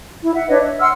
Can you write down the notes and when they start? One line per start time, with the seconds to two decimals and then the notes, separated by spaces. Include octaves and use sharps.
0.23 E4
0.35 E5 F#5
0.49 D4 B4 C#5 D#5
0.61 E5
0.80 F#5 C6 E6 F6